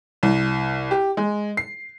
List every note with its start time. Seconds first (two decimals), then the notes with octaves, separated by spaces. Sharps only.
0.23 C2
0.91 G4
1.17 G#3
1.57 C7